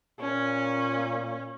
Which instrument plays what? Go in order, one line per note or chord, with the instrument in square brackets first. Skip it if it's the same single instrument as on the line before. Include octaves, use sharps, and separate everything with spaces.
[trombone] A#2 [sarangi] C#4